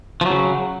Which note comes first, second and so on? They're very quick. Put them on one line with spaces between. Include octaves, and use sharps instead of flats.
F3 F#3 C#3